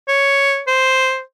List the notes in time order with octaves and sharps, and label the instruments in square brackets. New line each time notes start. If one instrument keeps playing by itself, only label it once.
[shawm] C#5
C5